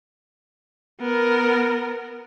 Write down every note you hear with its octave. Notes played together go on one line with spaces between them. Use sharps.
B3 A#4